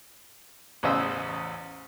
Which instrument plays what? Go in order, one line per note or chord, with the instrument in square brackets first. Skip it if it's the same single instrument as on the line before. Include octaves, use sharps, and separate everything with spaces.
[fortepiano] A1 E2 C#3 C5 D#5 E6